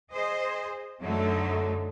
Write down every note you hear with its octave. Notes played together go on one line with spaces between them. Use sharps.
G#4 C5 D#5
F#2 D3 F#3 A3 D#4